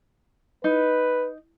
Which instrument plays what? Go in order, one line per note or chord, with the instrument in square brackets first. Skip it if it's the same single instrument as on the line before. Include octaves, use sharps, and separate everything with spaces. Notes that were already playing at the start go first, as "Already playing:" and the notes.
[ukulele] D#4 [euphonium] B4